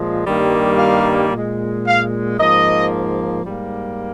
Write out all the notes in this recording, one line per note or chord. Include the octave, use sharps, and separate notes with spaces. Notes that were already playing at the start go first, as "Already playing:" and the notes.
Already playing: A#2 F3 G#3
G2 D#3 G3 A#3
F5
A#2 G#3
F5
G#2 F3 A#3 D#5
G#2 G3 A#3